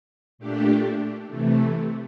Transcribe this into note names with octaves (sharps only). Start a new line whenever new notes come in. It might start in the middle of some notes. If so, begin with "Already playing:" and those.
A#2 A3 D4 G4
C3 E3 A3